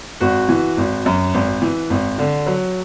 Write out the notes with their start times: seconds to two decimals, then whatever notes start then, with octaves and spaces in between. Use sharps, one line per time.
0.20 G#1 F#4
0.49 E3
0.77 G#1
1.06 F#2
1.34 G#1
1.62 E3
1.90 G#1
2.18 D3
2.46 F#3